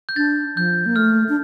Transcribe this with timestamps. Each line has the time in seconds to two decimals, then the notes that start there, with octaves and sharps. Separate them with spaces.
0.09 G6
0.16 D4 A6
0.56 F3 G6
0.86 A#3
0.96 A3 F6
1.29 D4